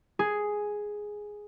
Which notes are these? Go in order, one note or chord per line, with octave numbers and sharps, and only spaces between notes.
G#4